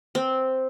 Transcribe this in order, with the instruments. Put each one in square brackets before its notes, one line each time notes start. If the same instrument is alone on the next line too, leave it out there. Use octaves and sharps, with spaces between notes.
[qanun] C4